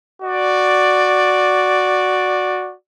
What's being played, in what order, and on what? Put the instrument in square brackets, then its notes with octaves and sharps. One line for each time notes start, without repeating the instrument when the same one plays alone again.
[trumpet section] F#4 D5